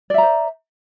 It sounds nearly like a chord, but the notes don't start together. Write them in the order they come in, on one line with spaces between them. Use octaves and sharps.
D5 E5 A#5 C5